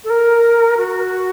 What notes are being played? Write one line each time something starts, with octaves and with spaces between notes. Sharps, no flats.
A4
A#4
F#4